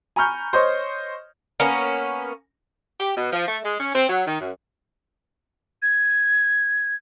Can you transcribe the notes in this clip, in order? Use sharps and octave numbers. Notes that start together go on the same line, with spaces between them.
G#5 A#5 B5 C#6 F6 G6
C5 C#5 D#5 C#6
A#3 B3 C#4
G4
B2
F3
A3
G#3
C#4
C4
F#3
D#3
F#2
G#6